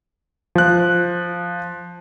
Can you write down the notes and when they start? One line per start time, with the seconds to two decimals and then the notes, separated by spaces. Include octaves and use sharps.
0.55 F3 F#6